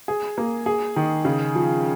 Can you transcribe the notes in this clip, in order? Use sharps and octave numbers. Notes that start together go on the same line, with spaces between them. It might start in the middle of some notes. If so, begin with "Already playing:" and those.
G#4
A#3
G#4
D#3
C#3
F3